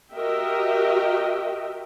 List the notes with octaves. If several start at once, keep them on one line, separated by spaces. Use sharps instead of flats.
F#4 G4 A#4 D#5 E5 G5